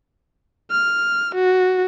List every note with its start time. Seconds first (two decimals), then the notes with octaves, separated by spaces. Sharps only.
0.71 F6
1.35 F#4